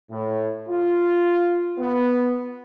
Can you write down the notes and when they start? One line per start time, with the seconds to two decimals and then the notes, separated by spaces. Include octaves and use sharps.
0.10 A2
0.68 F4
1.79 B3